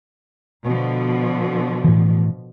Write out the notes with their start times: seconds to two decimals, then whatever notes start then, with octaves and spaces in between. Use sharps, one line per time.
0.64 B2 D3 F3
1.84 A2 E3